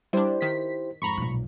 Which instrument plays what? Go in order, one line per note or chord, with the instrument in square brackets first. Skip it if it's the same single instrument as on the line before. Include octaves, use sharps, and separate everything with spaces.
[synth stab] G3 D4 [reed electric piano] E4 G4 C5
[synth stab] D#3 B6
[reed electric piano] F2 G#2 [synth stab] A#5 B5 C#6
[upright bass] B1 A#2